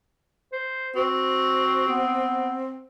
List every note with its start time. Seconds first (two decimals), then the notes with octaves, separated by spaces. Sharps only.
0.52 C5
0.96 C4 F#4
1.88 B3